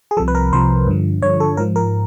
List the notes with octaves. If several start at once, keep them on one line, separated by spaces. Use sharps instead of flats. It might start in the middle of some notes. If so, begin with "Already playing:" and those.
G#4
C2 C3 F3 A4
B4
A#4
C2 C3 F3 C5
G2 D3 F3
G2 D3 F3 C#5
A4
G#2 F3 A#4
A#4